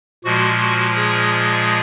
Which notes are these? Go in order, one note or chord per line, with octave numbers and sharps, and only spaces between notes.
A#2 F3 G#3 F#4
F#4
G#4